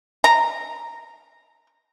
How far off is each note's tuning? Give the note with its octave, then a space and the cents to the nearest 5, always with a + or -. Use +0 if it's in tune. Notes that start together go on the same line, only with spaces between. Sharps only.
A#5 -10